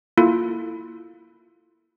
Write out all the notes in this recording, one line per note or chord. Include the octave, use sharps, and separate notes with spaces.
A#3 E4 F4 A4